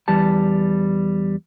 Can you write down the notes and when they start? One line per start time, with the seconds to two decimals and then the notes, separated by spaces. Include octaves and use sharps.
0.08 E2 G3 A5